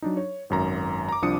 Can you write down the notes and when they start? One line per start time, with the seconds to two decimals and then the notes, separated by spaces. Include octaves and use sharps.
0.02 F#3 D4 D#4
0.17 C#5
0.50 G#1 F#2 A#5
1.09 A#5 D6
1.22 C2 F3 D4 D#6 C#7